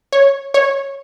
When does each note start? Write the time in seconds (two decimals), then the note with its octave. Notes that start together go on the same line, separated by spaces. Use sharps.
0.12 C#5
0.54 C#5